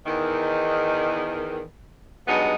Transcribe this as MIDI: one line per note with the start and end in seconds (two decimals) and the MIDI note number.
0.05 1.62 40
0.05 1.62 51
2.28 2.55 43
2.28 2.55 54
2.28 2.55 56
2.28 2.55 59
2.28 2.55 63